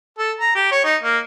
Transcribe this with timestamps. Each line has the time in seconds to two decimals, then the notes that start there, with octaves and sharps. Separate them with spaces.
0.18 A4
0.40 A#5
0.55 G4
0.71 C#5
0.84 D#4
1.03 A#3